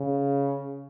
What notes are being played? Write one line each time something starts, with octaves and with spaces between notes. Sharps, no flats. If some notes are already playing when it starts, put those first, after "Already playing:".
Already playing: C#3